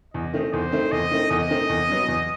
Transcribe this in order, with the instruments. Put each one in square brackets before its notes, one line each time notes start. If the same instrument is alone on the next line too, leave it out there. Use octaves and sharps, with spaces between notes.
[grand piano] E2 [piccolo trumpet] D#5
[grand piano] D#3 A3 C4 D#4
[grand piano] E2 [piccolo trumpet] C5
[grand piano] D#3 A3 C4 D#4
[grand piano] E2 [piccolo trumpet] D#5
[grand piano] D#3 A3 C4 D#4
[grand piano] E2 [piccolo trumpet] D#5
[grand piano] D#3 A3 C4 D#4
E2
C3 F#3 B3
E2